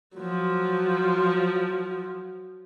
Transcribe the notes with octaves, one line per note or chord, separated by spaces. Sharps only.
F3 F#3